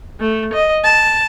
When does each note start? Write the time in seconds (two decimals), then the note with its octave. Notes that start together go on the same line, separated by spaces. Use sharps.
0.20 A3
0.53 D#5
0.84 A5